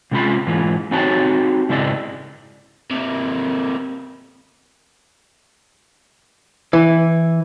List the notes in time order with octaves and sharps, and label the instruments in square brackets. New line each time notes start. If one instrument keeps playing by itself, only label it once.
[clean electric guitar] C3 G#3 C#4 F4 B5
G#2 E3 F4
C4 D#4 F#4 G4 C#5 A5
G#2 C#3 E4 D5 D#5
[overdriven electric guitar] C3 A#3
[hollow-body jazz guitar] E3